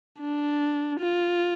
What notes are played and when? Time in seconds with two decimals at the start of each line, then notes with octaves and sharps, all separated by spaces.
0.21 D4
1.00 F4